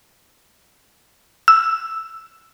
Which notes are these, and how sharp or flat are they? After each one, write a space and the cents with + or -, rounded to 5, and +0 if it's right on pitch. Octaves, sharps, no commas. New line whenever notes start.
E6 -5